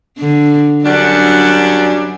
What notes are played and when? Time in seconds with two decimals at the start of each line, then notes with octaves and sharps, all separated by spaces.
0.18 D3
0.85 F#2 F#3 G3 D4 F#5